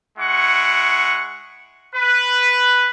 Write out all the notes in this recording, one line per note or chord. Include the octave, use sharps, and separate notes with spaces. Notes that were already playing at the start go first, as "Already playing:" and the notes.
G#3 E4 F#5 C#6
B4